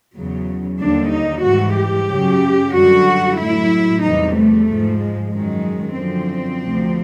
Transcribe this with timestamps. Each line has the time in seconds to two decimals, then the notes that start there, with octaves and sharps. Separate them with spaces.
0.15 E2 C#3 F#3
0.79 D#2 D3 G3 D4
1.12 D#4
1.44 G#2 E3 G3 F#4
1.76 G4
2.09 F#2 C#3 F#3
2.73 F#2 D3 G3 F#4
3.38 A2 F#3 E4
4.03 E2 C3 E3 G3 D#4
4.35 A3
4.67 G#2 F3
4.99 G#3
5.31 F#2 D#3 F#3 G#3
5.96 F#2 D3 F3 C4
6.61 D2 C3 F3